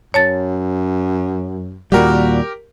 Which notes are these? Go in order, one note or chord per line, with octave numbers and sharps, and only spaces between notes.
F#2 C#5 A5 A6
D#2 A#2 G3 F#4 G4 A#4